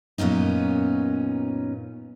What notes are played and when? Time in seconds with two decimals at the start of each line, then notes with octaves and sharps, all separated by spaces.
0.18 F#2 A#2 B3 C#4 D#4